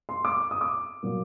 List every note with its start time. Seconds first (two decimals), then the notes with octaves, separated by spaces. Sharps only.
0.09 C6
0.25 D6
0.51 D#6
0.61 D6
1.03 A#2 F#3 A#3